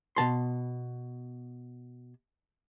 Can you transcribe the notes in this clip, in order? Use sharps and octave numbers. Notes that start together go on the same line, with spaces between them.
B2 A5 C6